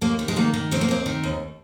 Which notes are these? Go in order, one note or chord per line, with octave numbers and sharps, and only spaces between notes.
D#2 A#3
D#3
G#3
D#3 A#3
D#3
D#2 C4
A#3
D#2 C4
D#3
D#2